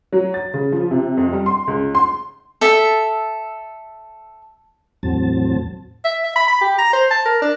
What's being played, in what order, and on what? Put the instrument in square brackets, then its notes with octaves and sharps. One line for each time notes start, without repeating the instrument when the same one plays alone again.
[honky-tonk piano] F#3
A6
C#3
F3
C3
F2
G3
C6
C#2
C6
[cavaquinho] A4 E5
[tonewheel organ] E2 A2 F#3 C4 A5
[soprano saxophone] E5
E5
B5
B5
G4
A#5
C5
A5
A#4
D4